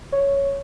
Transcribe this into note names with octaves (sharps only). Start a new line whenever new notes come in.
C#5